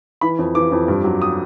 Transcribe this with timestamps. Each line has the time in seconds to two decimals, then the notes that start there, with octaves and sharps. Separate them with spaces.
0.21 E3 B5
0.39 F2
0.55 E3 D6
0.72 F2
0.88 G2
1.04 F#3
1.22 D#6